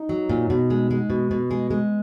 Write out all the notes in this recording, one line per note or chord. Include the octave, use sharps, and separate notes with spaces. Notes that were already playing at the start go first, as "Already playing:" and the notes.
Already playing: D#4
F#3
A#2
B2
G#3
G#3
B2
B2
G#3
G#3